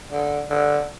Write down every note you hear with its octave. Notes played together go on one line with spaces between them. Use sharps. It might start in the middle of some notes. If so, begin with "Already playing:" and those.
D3
D3